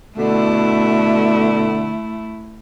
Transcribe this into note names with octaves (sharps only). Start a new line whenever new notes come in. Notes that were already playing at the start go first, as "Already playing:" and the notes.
B2 D3 A3 E4